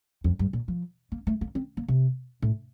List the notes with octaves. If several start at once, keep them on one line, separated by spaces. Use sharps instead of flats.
F2
G2
A#2
F3
A#3
A3
A#3
C4
A#3
C3
A2